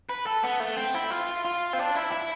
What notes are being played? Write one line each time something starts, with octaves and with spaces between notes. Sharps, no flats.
B4
A4
B3
A3
C4
E4
F4
F4
C4
D4
E4
E4